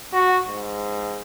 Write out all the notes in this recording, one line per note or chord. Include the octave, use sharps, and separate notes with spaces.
F#4
G#2